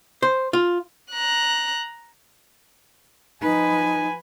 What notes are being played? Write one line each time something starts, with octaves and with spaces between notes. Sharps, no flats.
C5
F4
A#5 F#6
F3 D#4 B4 G#5